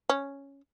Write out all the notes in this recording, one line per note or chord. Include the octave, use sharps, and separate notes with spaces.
C#4